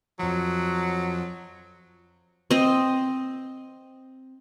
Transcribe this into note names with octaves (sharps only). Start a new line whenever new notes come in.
F2 F3 F#3
C4 D#5